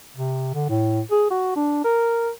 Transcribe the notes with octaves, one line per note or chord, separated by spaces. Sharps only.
C3
D3
A2
G#4
F#4
D4
A#4